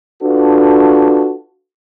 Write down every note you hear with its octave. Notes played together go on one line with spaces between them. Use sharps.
D4 F4 F#4 A4 B4